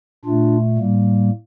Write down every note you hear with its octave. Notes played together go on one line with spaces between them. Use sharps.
A#2 A3 D4 F4
A2 G3 A#3